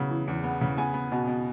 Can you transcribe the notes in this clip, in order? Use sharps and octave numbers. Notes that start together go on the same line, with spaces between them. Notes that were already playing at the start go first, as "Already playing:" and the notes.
Already playing: C#3 F#3 B3
E3
E2
B3
C#3
B3 G#5
B3
B2
B2